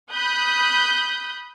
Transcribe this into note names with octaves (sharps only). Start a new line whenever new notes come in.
B5 D#6 F#6 G6